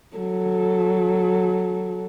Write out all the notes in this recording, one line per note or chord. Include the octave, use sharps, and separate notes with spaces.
F#3 A4